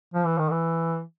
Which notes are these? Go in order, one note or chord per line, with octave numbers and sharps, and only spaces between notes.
F3
E3
D#3
E3